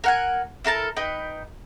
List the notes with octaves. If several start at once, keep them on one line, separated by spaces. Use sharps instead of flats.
A#4 F#5 G#5
E4 A4 A#4 A5
D#4 B4 G5